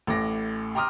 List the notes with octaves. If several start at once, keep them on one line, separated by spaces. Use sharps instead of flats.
A1 A2 D6 A#6
G5 A#5 C6 D6 D#6 F6